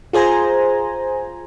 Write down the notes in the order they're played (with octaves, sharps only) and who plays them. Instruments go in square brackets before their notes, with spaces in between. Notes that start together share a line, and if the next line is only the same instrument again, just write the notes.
[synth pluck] F4 G#4 C5 G#5 A#5